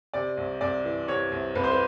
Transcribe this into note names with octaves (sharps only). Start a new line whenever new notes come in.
C3 D5
C2
C2 D5
E3
C3 C#5
C2
C2 B4
C5
B4